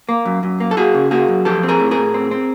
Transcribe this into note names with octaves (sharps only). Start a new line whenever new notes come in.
A#3
F#2
F#2
A#3
A4
A#3 F#4 G#4
C#3
A#3 F#4 G#4
F#2
F3 G4 A4
C4
G#4 A#4
A2
G#4 A#4
A2
C4
C4